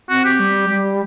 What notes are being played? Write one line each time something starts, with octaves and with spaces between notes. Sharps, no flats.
C4 F#4
G4
G3
G3